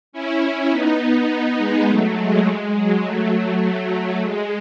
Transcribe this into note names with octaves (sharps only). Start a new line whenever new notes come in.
C#4 E4
C#4 E4
B3 D#4
B3 D#4
G#3 B3
F#3 A3
G#3
F#3
F#3 A3
F#3 A3
F#3
G#3